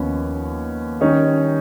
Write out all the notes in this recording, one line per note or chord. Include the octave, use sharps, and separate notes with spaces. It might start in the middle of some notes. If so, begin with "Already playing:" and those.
Already playing: D#2 F3 B3 C#4
D#3 G3 C#4 D#4